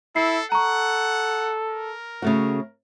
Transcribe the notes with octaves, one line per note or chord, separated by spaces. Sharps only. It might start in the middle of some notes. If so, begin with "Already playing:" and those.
E4 A4 C7
A4 F#5 A#5 C#6
A#4
C#3 A3 F#4